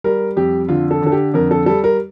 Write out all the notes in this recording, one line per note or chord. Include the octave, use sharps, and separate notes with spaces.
G3 A#4
F2 G4
D3 F4
A4
D3 A4
G4
F2 A#4
A4
G3 A4
A#4